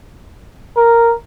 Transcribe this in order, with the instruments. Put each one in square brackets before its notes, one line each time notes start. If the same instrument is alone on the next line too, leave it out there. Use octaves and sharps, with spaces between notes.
[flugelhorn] A#4